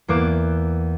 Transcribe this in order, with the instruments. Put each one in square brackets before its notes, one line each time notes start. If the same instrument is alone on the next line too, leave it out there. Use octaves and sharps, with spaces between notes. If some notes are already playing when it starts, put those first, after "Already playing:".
[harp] E2 A#3 D6 F#6 E7